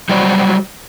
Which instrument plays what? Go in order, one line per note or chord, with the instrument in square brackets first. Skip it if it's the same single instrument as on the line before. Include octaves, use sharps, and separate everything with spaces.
[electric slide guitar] F#3 G3 F#4 C5 D5